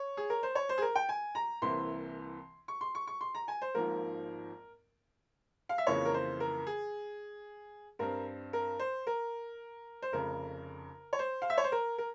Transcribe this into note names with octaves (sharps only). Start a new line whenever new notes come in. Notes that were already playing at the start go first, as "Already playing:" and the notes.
Already playing: C#5
G#4
A#4
C5
C#5
C5
G#4
A#4
G5
G#5
A#5
C2 C3 E3 A#3 C6
C#6
C6
C#6
C#6
C6
A#5
G#5
C5
G#1 G#2 F3 A#3 A#4
F5
E5
F2 C#3 E3 A#3 C#5
A#4
C5
A#4
G#4
G2 G3 C4 A#4
A#4
C5
A#4
C5
F1 F2 C#3 A#4
C#5
C5
F5
E5
C#5
C5
A#4
A#4